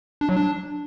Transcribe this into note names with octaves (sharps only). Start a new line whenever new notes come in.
D4
F#3
D4